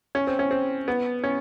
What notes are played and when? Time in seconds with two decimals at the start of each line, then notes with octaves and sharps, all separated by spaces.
0.15 C#4
0.27 C4
0.39 C#4
0.51 C4
0.88 B3
1.24 C#4